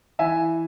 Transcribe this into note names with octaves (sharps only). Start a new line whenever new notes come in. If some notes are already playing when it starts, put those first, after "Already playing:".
E3 E5 G#5